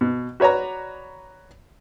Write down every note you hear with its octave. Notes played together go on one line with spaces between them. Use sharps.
B2
F#4 B4 C#5 D5 A#5